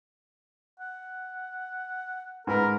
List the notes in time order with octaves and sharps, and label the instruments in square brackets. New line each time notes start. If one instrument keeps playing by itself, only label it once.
[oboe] F#5
[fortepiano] G#2 B4 B5 [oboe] A#4